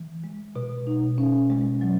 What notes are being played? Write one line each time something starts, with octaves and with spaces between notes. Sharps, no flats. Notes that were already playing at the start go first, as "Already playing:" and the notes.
Already playing: E3
G#3
B2
D#4
C#4
G#3
F#3